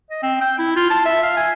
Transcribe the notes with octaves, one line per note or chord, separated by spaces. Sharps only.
D#5
C4
G5
E4
F4
A5
E5
F5
G#5